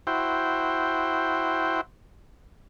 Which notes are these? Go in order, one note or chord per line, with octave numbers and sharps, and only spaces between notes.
E4 F#4 C5 G5